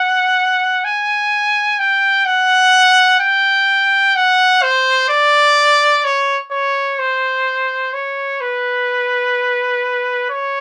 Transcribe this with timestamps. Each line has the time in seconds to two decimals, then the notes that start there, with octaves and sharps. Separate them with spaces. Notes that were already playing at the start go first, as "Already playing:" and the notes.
Already playing: F#5
0.85 G#5
1.79 G5
2.26 F#5
3.20 G5
4.15 F#5
4.62 C5
5.09 D5
6.04 C#5
6.51 C#5
6.99 C5
7.93 C#5
8.41 B4
10.30 C#5